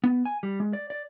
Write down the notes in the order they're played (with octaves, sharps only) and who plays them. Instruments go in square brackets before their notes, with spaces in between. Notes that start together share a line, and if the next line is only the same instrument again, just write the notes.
[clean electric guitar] B3
G#5
G3
G#3
D5
D5